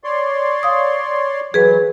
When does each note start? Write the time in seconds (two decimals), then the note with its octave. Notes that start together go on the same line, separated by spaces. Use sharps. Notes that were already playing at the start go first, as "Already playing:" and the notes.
0.04 C#5 D5 C6
0.63 F5 D#6
1.54 E3 F#3 G#4 B4